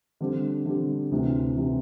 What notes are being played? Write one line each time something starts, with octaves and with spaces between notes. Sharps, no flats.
D3 G3 C4 G4
D3 G3 C4 G4
D2 C3 E3
C3 E3